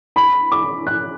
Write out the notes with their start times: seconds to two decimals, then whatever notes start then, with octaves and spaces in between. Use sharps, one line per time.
0.16 B5
0.52 D6
0.87 F#6